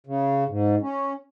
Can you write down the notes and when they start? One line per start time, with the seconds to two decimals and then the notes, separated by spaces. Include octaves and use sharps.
0.07 C#3
0.49 G#2
0.82 C#4